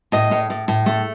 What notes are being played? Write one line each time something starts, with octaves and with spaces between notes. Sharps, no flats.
A2 D#5
A2
A2
A2
A3